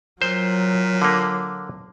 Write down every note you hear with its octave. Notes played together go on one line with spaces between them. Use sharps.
A#2 F#3 C5
D3 A#3